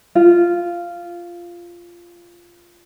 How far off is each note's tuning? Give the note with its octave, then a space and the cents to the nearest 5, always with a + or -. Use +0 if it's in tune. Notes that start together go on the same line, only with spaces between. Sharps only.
F4 -10